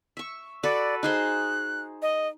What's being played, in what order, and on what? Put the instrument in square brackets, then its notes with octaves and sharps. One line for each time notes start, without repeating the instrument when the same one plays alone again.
[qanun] E5 C#6
[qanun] F#4 A4 B4 [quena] D5
[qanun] D#4 G#4 C5 [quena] F#6
[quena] D#5